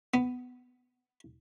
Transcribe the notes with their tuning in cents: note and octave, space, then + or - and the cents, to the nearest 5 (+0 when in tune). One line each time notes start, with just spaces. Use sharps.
B3 +15